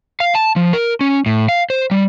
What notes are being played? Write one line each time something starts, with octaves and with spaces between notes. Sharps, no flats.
F5
A5
F3
A#4
C#4
A2
F5
C5
G3